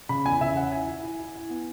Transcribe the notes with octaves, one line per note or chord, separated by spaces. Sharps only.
C#3 B5
E2 G#5
C#3 E5
C#4 F#5
E4 G#5
E4
E4
E4
E4
B3